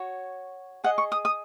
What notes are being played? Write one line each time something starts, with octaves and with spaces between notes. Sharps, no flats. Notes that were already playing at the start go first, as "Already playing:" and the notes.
Already playing: F#4 C#5
G#4 D#5 F#5
C#6
D#6
D#6